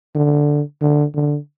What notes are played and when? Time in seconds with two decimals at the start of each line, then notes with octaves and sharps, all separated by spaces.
0.15 D3
0.81 D3
1.15 D3